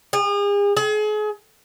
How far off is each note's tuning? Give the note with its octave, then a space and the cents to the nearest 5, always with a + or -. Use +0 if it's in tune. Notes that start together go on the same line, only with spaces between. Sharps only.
G#4 -40
G#4 +35